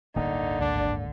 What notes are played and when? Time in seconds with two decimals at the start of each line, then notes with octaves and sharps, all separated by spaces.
0.16 D1 G1 D3 A#3 D#4
0.61 G#1 D2 D4